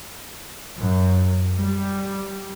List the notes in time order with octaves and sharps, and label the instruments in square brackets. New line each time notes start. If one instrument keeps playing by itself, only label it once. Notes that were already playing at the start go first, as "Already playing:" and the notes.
[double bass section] F#2
G3